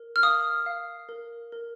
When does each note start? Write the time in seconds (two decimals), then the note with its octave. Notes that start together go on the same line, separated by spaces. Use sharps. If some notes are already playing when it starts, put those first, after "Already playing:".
Already playing: A#4
0.16 F6
0.23 F5 D#6
0.66 F5
1.09 A#4
1.52 A#4